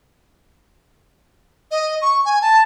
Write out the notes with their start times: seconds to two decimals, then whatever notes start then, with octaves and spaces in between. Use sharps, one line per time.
1.71 D#5
2.02 C#6
2.25 G#5
2.42 A5